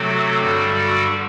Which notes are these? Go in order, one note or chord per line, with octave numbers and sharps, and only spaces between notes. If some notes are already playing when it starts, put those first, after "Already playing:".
Already playing: C3 F#3 A3 C4 F#4 A4
G2 D3 G3
F#4 A4